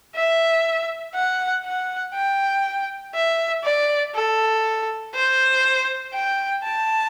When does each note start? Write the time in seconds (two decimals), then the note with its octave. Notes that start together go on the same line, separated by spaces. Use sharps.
0.15 E5
1.15 F#5
1.65 F#5
2.14 G5
3.15 E5
3.64 D5
4.15 A4
5.15 C5
6.14 G5
6.64 A5